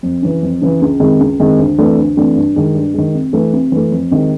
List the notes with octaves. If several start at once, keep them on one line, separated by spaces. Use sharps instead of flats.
F2
C#3 E3
F2
C#3 E3
C#2
C3 D#3 G#3
C#2
C3 D#3 G#3
D2
C3 E3 A3 D4
D2
C3 E3 A3 D4
G2
D#3 G#3
G2
D#3 G#3
C3
E3 A3
C3
E3 A3
F2
C3 D#3 G#3 C4